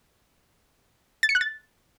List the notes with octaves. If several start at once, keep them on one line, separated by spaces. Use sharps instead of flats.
A6
C#7
F#6
A6